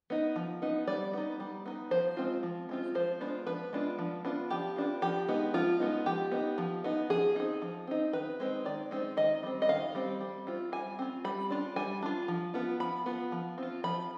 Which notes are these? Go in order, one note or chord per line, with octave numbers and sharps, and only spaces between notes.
B3 D#4
F3
B3 D#4
G3 D5
B3 D#4
G3
B3 D#4
F3 C5
G#3 C4 F4
F3
G#3 C4 F4
F3 C5
G#3 B3 D4 F4
F3 B4
G#3 B3 D4 F4
F3
B3 D4 F4
F3 G4
B3 D4 F4
F3 G4
G#3 B3 D#4
F3 F4
G#3 B3 D#4
F3 G4
B3 D#4
F3
B3 D#4
F3 G#4
C4 D#4
F3
C4 D#4
D#3 B4
G#3 C4 D#4
D#3 D5
G#3 C4 D#4
D#3 D#5
G3 C4
D#5
D#3 F5
G3 C4
G3
C4 F4
G3 G#5
C4 F4
G3 B5
D4 F4
G3 G#5
D4 F4
F3
B3 F4
F3 B5
B3 F4
F3
C4 F4
F3 B5